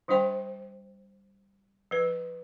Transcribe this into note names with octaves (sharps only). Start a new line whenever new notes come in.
D#3 G3 D4 C5 G5
F3 B4